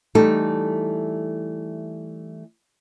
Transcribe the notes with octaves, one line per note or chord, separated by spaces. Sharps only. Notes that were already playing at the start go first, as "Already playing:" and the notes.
E3 G3 A3 D#4 A4